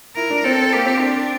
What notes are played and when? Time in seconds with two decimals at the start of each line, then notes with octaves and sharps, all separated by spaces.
0.16 E4 A#4
0.30 D4
0.44 C4 A4
0.73 A#3 G4
0.86 C4
1.01 D4